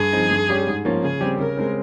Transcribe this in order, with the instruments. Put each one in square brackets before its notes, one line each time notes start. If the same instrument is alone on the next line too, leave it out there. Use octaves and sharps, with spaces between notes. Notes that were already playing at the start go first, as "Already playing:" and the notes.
Already playing: [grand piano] G2 [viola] G#4
[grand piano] F3 C4 D#4
G2
G3 C#4 G4
G#2
F3 A#3 C#4 F4
[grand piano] C#3 [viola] G#4
[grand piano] G3 C4 G4
[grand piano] C#3 [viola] A#4
[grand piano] G#3 C4